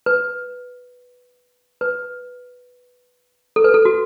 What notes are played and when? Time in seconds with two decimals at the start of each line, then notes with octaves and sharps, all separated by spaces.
0.06 B4
1.81 B4
3.56 A4
3.64 B4
3.74 A4
3.85 F#4